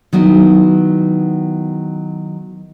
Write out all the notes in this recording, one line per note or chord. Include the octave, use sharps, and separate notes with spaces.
D#3 F#3 B3 E4